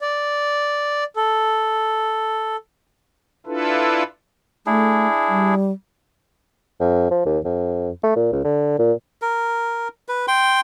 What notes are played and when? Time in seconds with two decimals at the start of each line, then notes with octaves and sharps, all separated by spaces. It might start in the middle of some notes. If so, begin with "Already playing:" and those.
0.01 D5
1.16 A4
3.46 D4 E4 F4 A4 B4
4.66 A3 D4 E4 G#4
5.28 G3
6.80 F2
7.11 F3
7.26 D#2
7.45 F2
8.03 A3
8.16 A#2
8.33 C#2
8.45 D3
8.79 A#2
9.22 A#4
10.08 B4
10.28 G5 C6